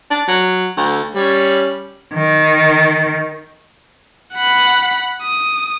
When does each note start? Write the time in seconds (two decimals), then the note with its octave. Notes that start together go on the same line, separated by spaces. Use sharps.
0.11 D4
0.28 F#3
0.77 D2
1.16 G3 C#4 C#5
2.15 D#3
4.35 F#5 B5
5.23 D#6